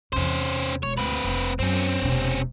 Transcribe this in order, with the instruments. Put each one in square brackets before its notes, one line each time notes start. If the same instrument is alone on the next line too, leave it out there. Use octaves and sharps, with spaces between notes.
[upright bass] E2 C3 [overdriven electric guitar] C#4 C5
[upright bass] E1 [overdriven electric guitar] C#5
[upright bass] D2 [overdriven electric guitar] C4 B4
[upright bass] F1
[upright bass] F#2 [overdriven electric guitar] C4 C#4
[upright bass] E1 C3